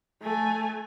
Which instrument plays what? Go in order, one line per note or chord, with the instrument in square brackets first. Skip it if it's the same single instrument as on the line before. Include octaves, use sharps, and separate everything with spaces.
[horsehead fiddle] A3 G#5